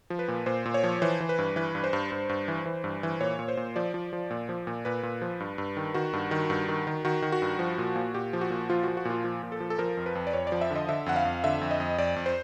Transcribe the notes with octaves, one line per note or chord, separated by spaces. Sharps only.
F3
B4
A#2
A#2 C5
A#2
C#5
F3
E3 C5
E3
B4
G2
E3 B4
G2
C5
G2
G2
G2
E3
E3
G2
E3
A#2 C#5
A#2
C5
A#2
F3 D5
F3
F3
A#2
F3
A#2
A#2 B4
A#2
F3
G2
G2
D#3
D#3 F#4
G2
D#3
G2
D#3
D#3
D#3 F#4
D#3
F#4
G2
F3
A#2
A#2
A#2 G4
F3
F#4
A#2
F3 F4
F3 F#4
F#4
A#2 F4
F3
A#2
A4
F3
A4
F3 A#4
F2
B4
F2
D5
F2 C#5
D5
F3
E5
D3 D#5
D3 E5
F2 F#5
F5
F2
D3 E5
F2
D#5
F2
F2 D5
F2
C5